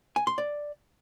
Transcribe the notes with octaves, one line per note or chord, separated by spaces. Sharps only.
G#5
C6
D5